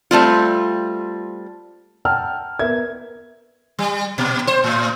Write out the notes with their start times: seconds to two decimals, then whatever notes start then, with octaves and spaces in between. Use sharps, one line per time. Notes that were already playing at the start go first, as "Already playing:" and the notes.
0.11 G3 A3 C4 F4
2.05 F#5 G5 A5 A#5 E6 F6
2.59 B3 A#4 E5 G#6
3.79 G3
4.18 A#2
4.47 C5
4.64 A2